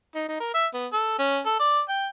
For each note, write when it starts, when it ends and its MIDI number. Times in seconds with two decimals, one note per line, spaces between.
0.15 0.24 63
0.29 0.37 63
0.40 0.50 70
0.54 0.67 76
0.74 0.87 59
0.93 1.17 69
1.19 1.40 61
1.45 1.56 69
1.60 1.82 74
1.89 2.07 79